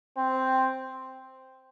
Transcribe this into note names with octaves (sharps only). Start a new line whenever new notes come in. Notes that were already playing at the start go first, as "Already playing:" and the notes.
C4